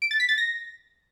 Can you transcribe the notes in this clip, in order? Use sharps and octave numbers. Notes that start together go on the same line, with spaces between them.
D7
A6
B6
A6
A#6